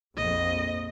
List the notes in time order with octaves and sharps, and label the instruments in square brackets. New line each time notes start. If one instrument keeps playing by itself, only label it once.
[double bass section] A#1 F2 [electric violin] D#5